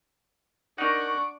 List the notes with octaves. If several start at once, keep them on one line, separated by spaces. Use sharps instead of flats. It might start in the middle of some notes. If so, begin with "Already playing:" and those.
D4 D#4 A#4 F#5 C#6 D7